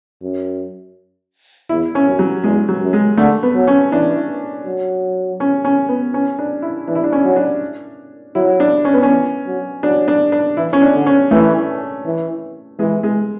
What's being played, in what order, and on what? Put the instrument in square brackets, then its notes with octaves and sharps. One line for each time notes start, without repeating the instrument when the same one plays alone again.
[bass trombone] F#2
[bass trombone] E2 [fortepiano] E4
[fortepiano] C#4
[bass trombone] F#2
[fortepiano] F#3
[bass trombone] E2 [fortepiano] G#3
[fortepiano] F#3
[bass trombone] F#2
[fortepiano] G#3
[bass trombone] D3 [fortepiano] A3
[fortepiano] B3
[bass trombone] F#3
[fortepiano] C#4
[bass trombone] E3 [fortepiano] D4
[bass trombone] F#3
[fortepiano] C#4
C#4
B3
C#4
D4
E4
[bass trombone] E3 [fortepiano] D4
[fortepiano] E4
D4
C#4
[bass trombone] F#3
[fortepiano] D4
[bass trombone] F#3 [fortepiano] E4
[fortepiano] D4
C#4
B3
C#4
[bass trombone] E3
F#3
[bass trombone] F#3 [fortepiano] D4
[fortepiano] D4
D4
[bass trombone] E3 [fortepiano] E4
[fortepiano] C#4
D4
[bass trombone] D3
[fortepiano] C#4
[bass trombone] E3 [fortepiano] A3
[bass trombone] E3
[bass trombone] E3 [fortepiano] G#3
[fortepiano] G#3